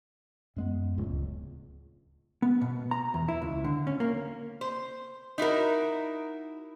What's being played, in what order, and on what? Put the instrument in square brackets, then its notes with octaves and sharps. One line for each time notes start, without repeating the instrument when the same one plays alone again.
[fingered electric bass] F#2 G#3 B3
D1 C#2
[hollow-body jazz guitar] B3
B2
A#5
E2
E4
C#2
D3
C#4
A#3
[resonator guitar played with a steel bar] C5
D#4 E4 F#4 A#4